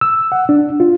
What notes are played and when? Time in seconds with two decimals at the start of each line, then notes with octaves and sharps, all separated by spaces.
0.01 E6
0.32 F#5
0.49 D4
0.80 F4